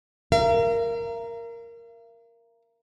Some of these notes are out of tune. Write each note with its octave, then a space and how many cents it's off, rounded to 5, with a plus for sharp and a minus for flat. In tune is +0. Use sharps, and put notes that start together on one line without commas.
A#4 +0 F5 -45